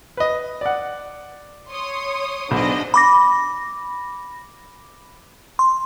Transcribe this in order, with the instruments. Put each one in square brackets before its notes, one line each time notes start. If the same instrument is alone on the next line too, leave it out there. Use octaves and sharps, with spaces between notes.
[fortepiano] B4 D#5
D5 F#5
[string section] C#5 C6 D#6
[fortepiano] B1 [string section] G#2 D4 D#5
[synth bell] B5 D6 A#6
C6